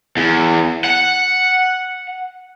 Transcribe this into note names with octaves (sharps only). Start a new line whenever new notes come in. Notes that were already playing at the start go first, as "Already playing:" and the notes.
E2
F#5